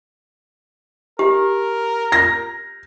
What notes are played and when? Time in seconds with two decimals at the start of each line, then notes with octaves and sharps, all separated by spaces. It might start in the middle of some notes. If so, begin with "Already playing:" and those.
1.19 G4 A#4
2.12 A#6